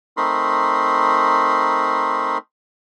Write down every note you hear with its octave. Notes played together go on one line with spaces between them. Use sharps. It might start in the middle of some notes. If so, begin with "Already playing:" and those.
A3 C4 D#4 A#4 B5 C6